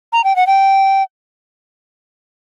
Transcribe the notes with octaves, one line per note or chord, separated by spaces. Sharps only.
A#5
G5
F#5
G5